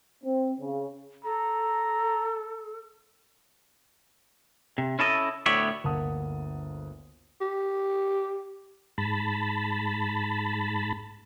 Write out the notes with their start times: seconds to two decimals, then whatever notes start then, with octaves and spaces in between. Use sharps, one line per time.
0.23 C4
0.59 C#3
1.24 A4 A#5
4.78 C3
4.99 C#4 E4 A4 D#5
5.46 D2 A2 B3 C#5 D5 E5
5.84 G1 D2 A#3 F#5 A5 D#6
7.41 G4
8.98 G#2 A5 B5